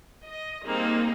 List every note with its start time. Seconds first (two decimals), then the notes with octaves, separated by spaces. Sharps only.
0.23 D#5
0.66 G3 A#3 C4 D#4 G#4